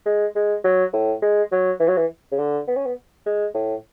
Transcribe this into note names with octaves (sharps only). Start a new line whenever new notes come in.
G#3
G#3
F#3
A2
G#3
F#3
E3
F#3
E3
C#3
D3
B3
C#4
B3
G#3
A2